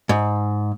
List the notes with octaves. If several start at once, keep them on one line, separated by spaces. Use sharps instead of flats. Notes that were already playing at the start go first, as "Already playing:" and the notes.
G#2